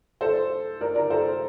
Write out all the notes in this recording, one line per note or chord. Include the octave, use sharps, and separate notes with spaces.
A4 C5
A#4 D5
A#4 D5
A4 C5